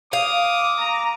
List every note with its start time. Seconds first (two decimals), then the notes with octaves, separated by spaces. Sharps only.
0.13 F5 D6 D#6
0.80 A#5